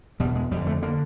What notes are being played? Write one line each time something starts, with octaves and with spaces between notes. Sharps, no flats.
E2 B2 G3
G#3
F2 D3 G3
A3
D3 A#3